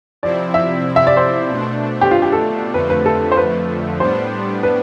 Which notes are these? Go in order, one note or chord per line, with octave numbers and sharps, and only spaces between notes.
C3 F3 C4 E4 D5
E5
E5
D5
C5
B2 A3 D4
G4
F4
G4
A4
F2 D3 F3 A3 B4
B4
A4
C5
B4
A2 G3 B3 D4 C5
B4